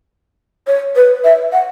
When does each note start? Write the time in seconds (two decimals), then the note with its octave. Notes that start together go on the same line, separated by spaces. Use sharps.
0.67 C#5
0.96 B4
1.24 E5
1.52 F#5